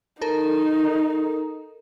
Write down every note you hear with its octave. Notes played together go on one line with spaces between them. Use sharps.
D#4 A4 A#4